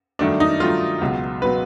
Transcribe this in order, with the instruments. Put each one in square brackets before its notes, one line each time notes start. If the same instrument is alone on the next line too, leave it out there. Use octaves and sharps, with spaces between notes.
[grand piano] G2 D#3 F#3 A3 D4
D#4
G2 D#3 F#3 A3 F4
C#2 B2 F#3
B2 F#3 B4